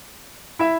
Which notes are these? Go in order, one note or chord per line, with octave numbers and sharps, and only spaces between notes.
E4 E5